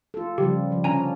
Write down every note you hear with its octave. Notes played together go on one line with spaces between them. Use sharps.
F4 A4
C#3 F3 G3 G4
F3
D3 C#4 D4 G#5 A#5